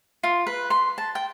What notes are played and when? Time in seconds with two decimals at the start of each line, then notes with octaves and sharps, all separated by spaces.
0.23 F4
0.47 B4
0.70 C6
0.98 A5
1.15 G5